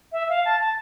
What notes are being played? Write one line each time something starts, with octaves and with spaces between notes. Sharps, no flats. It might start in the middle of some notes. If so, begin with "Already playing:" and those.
E5
F5
A5
A5